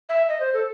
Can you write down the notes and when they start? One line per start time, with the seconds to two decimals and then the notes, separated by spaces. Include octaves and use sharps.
0.09 E5
0.29 D#5
0.40 C5
0.54 A4